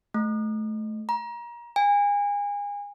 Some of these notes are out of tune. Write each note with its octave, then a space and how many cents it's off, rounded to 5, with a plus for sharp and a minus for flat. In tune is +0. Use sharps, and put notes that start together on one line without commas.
A3 -20
A#5 +30
G#5 -30